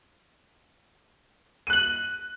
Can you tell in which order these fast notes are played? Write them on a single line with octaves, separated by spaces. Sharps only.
D#7 F#6 F#7